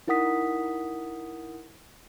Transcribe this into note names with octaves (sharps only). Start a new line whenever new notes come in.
D#4 E4 A#4 F#5 D#6 B6